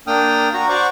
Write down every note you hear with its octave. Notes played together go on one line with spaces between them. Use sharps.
A#3 D4 G5 D#6 F6
F#4 A#5
C5 D5 F#5 C#6 D6